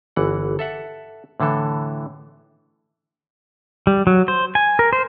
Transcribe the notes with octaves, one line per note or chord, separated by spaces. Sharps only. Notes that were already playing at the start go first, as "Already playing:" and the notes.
G1 E3 F#5
A4 E5 F#5
A2 D3 E3 A4
G3
F#3
C5
G#5
A#4
C5